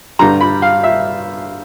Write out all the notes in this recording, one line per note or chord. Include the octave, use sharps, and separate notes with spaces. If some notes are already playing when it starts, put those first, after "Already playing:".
G2 D3 G3 A#5
B5
F5
E5